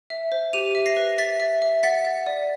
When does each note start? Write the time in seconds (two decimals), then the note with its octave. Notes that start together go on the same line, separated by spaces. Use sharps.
0.10 E5
0.32 C5
0.53 G4 D#7 F7
0.75 E5
0.86 A#6 C7
0.97 B4
1.18 E5 A6 B6
1.40 E5
1.62 E5
1.83 F#5 A6 B6
2.05 F#5
2.26 D5